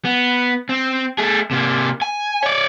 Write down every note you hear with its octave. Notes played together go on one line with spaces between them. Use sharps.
B3
C4
A3 G#4
C3 A#3
G#5
C#5 D5